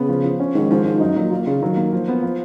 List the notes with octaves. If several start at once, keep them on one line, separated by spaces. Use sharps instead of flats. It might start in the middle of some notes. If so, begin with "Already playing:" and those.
Already playing: C#3 B3
F3
F3
C#4
G#2 D#3
G#2 F3
G#2 D#4
F#2 D#4
A#2 F#3
A#2 F4
C#3 F4
D#3 F#3
A#3
F3
B3
F3